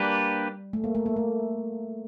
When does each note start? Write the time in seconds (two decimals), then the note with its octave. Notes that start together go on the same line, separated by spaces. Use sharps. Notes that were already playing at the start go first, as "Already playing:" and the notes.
Already playing: G3 A#3 D4 G4 B4
0.73 A3
0.84 A#3
0.95 A3
1.06 A#3
1.16 A3